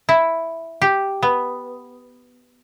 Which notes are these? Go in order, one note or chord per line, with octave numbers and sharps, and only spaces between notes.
E4
G4
B3